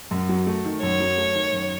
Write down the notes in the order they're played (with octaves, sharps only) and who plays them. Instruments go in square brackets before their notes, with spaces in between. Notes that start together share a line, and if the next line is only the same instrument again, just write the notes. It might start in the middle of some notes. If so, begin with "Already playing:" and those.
[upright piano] F#2
F#3
A3
D#3
[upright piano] F#2 [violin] C#5
[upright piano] F#3
A3
D#3
F#2